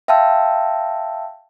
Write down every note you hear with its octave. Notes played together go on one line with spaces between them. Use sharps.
E5 F5 G5 A5 C6 E6